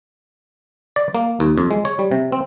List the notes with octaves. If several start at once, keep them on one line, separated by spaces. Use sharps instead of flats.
D5
A#3
D#2
F2
G#3
C#5
G3
C3
C4